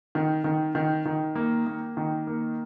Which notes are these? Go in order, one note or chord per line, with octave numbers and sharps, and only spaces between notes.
D#3
D#3
D#3
D#3
A#3
A#3
D#3
A#3